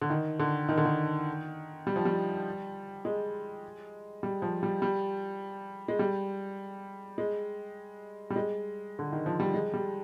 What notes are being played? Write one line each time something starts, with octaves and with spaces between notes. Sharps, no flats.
D3
D#3
D3
D#3
D3
D#3
G3
F3
G3
G#3
G3
F3
G3
G3
G#3
G3
G#3
G3
G#3
D3
D#3
F3
G3
G#3
G3